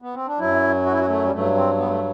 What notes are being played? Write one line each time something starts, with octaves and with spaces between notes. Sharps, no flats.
B3
C4
D4
F#2 F#3 E4
F#4
E4
F#4
A3
G3
G2 F#3 A3
C4
B3
A3